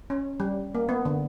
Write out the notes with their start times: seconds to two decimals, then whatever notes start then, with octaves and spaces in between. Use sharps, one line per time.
0.10 C#4
0.40 G3
0.75 A#3
0.89 B3
1.05 D3